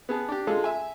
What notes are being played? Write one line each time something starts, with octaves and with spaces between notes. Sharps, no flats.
B3 G#4 A5
D4 G4
G#3 F4 G#4 A4
E5 G#5